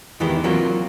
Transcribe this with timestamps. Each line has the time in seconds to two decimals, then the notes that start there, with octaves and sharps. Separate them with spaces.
0.20 E2 D#3 E3 G#3 E4 G4
0.44 F#3 A#3 C4 F4